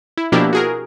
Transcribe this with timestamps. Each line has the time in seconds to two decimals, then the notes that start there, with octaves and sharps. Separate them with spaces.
0.17 E4
0.32 B2 F3 A#3 D4 E4 G4
0.53 F#4 G#4 A#4